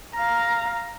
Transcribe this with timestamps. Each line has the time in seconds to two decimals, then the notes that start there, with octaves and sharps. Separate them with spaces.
0.15 F5 A#5